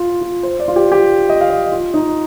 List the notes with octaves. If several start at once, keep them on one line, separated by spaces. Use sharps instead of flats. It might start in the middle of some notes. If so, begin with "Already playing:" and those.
Already playing: F4
F4
C5
D5
F4
G4
G4
D#5
F5
D#5
F4
D#4